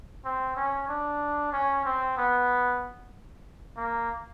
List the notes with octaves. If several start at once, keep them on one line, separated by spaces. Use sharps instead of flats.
C4
C#4
D4
C#4
C4
B3
A#3